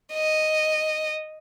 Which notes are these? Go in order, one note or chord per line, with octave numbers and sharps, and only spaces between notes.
D#5